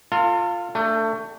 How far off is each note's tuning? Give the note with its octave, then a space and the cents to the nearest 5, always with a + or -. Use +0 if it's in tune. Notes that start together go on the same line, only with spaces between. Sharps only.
F4 +0 A4 +45
A3 +25 D4 +0